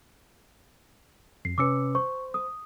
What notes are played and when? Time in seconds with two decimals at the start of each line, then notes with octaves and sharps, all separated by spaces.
1.45 F2 C7
1.58 C3 C#4 B4 D6 E6 C#7
1.95 C5 C#6
2.34 D#6